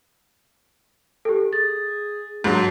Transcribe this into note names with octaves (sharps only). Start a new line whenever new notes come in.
G4 A4
G#4 A6
G#2 F#3 D4